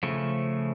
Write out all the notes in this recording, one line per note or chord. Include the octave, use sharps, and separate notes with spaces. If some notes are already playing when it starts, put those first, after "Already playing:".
C#3 F3 A3